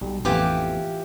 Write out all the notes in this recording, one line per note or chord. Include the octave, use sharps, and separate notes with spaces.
B1 G3
A1 F2 E3 B3 F4 G4